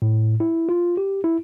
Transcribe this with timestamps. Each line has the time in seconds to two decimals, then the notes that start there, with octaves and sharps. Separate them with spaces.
0.02 A2
0.40 E4
0.69 F4
0.97 G4
1.24 E4